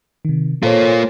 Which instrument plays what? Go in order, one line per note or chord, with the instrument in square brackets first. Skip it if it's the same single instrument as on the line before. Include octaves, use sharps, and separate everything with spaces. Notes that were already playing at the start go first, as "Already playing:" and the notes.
[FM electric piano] C3 D#3
[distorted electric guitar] A#3 F4 [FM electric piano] A4 C5 C#5